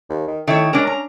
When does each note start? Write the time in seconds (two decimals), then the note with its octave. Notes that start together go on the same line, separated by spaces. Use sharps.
0.09 D#2
0.28 D#3
0.47 D#3 A3 E4 C#5
0.73 G#3 C#4 D4 A#4
0.87 A#5